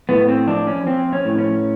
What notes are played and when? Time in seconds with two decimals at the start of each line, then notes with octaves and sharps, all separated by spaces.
0.09 A2 B3
0.28 C4
0.47 F3 D4
0.67 C#4
0.86 F3 C4
1.13 C#4
1.25 A2
1.38 C#4